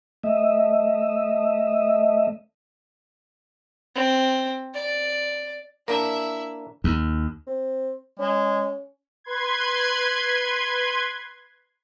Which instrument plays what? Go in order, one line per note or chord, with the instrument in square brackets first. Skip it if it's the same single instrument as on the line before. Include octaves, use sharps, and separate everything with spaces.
[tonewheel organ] A3 D#5 E5
[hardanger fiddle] C4
D5
[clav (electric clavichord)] A#3 D4 [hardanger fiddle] E4 E5 [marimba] A#4 D5 A#5
[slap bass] D#2
[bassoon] C4
[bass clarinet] G#3 [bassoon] C#4
[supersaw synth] B4 C6 G#6